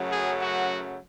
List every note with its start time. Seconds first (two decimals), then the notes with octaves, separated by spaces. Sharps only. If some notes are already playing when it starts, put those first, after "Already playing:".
Already playing: F#2 C#3 F#3 A3
0.11 G#4
0.41 F#4